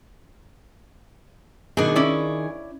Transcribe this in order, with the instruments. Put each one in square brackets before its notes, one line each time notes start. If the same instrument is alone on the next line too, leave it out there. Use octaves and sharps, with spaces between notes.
[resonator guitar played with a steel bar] B2 D4 [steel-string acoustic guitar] D#3 G#4
[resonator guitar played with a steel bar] C#4 E4 D5